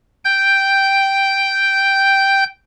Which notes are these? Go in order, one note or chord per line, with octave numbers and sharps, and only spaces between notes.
G5 G6